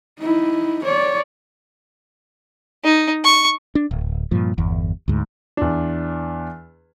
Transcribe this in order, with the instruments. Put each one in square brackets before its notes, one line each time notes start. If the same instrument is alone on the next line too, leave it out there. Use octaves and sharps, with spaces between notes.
[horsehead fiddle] D#4 E4
C#5 D5
[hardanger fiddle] D#4
C#6
[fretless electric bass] D4
D1
G2 A#2 F3
G1 E2
D2 G#2
[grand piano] E2 D4